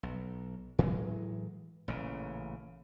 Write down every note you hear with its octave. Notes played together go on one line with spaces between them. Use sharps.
B1
A2 E3 F#3 G#3
A1 A#2 C#3